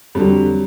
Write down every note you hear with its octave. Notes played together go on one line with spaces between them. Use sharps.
F2 D3 F#3 G3